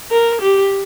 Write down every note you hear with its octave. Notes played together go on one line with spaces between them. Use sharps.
A#4
G4